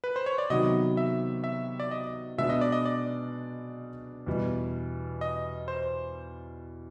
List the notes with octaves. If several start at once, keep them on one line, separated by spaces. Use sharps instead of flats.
B4
C5
C#5
D5
C3 D#3 F#3 B3 D#5
E5
E5
D5
D#5
B2 G#3 B3 D4 E5
D#5
D5
D#5
D5
E2 B2 G3
D#5
C5